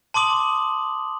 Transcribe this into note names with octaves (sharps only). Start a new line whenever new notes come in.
A5 C6 D6 D#6 F#7